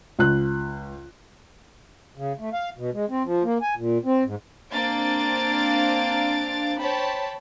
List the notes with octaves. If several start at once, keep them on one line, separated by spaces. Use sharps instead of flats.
C#2 F#6
C#3
A3
F5
B2
G#3
C4
F3
A#3
G#5
A#2
C4
G#2
A#3 C4 D4 F5 A6 D7
C5 C#5 G5 A5 B5